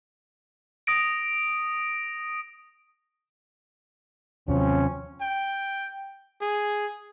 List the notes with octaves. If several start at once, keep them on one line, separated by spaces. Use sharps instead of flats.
D#6 A#6 D7
D#2 C3 F3 F#3 C4 C#4
G5
G#4